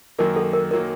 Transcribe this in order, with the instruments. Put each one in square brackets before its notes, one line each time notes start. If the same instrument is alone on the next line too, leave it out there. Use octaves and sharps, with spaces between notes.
[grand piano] F#2 D#3 F#3 A#3 [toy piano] A#4
[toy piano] A4
A#4
[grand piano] D#3 F#3 A#3 [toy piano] A#4